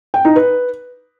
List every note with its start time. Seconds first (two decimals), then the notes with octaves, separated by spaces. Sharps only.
0.14 G5
0.25 D#4
0.36 B4